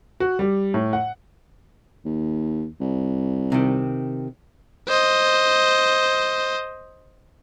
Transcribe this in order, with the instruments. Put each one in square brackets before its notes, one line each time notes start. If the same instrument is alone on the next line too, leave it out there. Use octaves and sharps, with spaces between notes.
[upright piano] F#4
G3
A2
F#5
[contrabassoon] D#2
C2
[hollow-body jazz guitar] C3 D#3
[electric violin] C5 D#5